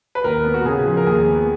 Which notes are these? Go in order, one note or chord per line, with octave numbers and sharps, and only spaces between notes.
B4
D#2 A#4
B3
F#4
C#3 G#4
F3
A#4
D#2 G#4
B3